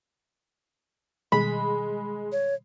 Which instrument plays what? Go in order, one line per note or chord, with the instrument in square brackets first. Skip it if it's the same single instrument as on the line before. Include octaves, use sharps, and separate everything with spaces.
[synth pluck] B2 D#3 G3 [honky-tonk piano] G#3 [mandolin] B5
[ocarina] C#5